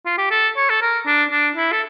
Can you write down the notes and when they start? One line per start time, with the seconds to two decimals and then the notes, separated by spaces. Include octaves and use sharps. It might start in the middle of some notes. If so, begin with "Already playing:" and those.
0.06 F4
0.18 G4
0.31 A4
0.57 C#5
0.70 A4
0.82 A#4
1.07 D4
1.31 D4
1.56 E4
1.72 A4